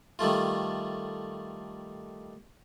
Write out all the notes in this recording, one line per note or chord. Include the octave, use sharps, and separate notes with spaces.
D#3 G3 A3 F4